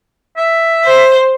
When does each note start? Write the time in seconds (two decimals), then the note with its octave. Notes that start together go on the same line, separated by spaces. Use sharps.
0.37 E5
0.84 C5